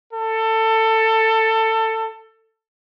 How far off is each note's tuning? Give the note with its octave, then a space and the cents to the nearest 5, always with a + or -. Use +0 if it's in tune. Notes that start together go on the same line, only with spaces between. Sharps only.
A4 +20